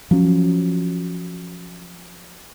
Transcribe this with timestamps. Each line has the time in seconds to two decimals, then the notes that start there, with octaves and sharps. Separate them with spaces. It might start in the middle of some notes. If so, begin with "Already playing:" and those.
0.11 F3 F#3 C#4